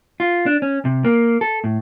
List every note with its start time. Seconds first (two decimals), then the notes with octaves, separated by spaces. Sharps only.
0.20 F4
0.46 D4
0.62 C#4
0.85 C3
1.05 A#3
1.41 A4
1.64 A2